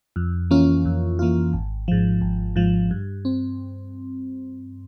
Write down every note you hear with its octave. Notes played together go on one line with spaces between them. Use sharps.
F2
E3 A#3 C#4 F4
F2
E3 A#3 C#4 F4
G#1
G#2 F3
G#1
G#2 F3
G2
C4